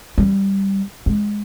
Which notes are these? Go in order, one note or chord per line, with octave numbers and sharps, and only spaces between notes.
G3
G#3